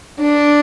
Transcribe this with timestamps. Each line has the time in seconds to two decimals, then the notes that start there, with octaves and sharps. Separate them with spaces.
0.20 D4